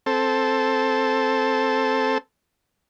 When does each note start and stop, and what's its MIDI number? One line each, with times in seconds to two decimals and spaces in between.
0.06 2.18 60
0.06 2.18 69